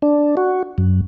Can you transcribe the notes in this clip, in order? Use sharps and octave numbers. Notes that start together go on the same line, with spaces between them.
D4
F#4
F#2